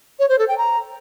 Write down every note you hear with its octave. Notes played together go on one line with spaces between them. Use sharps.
C#5
C5
A4
G5
A#5